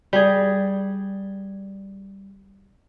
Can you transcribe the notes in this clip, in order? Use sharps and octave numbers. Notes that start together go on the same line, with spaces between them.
G3 G#4